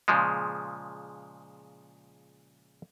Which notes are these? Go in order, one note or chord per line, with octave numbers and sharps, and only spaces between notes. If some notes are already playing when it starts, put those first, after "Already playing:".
A#2 C#3 F3 G#3